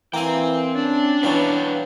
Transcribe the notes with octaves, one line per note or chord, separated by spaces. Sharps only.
E3 A#3 C4 G5 G#5
C#4 D4
B2 E3 F#3 B4 F5 G5